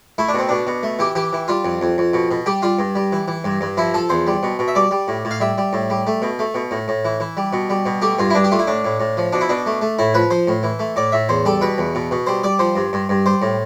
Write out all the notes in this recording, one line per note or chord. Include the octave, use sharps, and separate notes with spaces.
A3 E4
D4
B2 C4
B2 D4
B2
A3
E3 G4
E3 G4
E3
G3 F4
F2
F2
F2
B2
B2
G3 G4
G3 F4
G2
G3
E3
E3
G2
G2
F3 E4
F3 A4
E2 C5
G3
B2
B2
E5
G3 D5
G3
A2
A2
F5
G3 E5
G3
A2
G3
A3
B2
A3
B2
A2
A2
E3
E3
G3
B2
G3
B2
A3 G4
G2 F4
E4
G2 D4
G4
A3 F4
E4
A2 D4
A2
A2
F3
B2 D4
E4
B2 D4
A3
A3
A2 E4
F3 B4
F3 C5
A2
E3
A3
A2 D5
A2 E5
E2 C5
G3 A4
B2 B4
E2
B2
B2
G3 C5
G3 D5
F3 C5
G2
G2
G2
G3 C5
A2